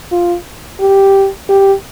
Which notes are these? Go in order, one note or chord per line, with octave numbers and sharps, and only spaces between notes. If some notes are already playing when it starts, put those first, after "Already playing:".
F4
G4
G4